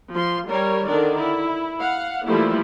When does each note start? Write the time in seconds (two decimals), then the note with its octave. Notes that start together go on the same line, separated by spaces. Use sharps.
0.13 F3 C6
0.48 G3 A#4 C#5
0.87 D3 D#3 D4 A#4 D5
1.19 E4
1.80 F5 F#5
2.26 E3 F3 G3 A3 A#3 E4